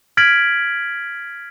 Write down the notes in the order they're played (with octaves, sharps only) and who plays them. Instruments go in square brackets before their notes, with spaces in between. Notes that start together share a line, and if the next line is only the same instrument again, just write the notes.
[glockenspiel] F6 G#6 A6 B6 D7 F#7